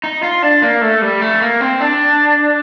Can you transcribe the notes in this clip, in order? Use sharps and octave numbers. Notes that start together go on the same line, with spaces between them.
D#4
F4
D4
A#3
A3
G3
A3
A#3
C4
D4